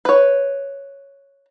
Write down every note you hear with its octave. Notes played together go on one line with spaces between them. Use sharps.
B4 C#5